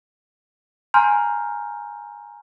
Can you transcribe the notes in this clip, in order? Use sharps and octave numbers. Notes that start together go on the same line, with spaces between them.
G#5 A#5 C6 F6 G6